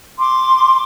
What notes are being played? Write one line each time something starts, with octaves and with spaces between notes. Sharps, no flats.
C6 D6